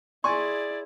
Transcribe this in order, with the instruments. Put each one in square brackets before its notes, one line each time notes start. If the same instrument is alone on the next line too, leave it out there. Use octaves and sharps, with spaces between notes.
[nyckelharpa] E4 G#4 [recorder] D5 [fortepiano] G#5 C#6 [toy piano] C6